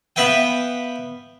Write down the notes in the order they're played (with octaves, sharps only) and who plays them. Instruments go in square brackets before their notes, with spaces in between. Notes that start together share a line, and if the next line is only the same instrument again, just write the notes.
[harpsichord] B3 B4 E5 F5 G5